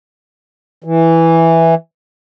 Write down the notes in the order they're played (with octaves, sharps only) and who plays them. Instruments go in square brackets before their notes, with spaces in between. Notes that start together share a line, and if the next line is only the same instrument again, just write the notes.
[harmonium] E3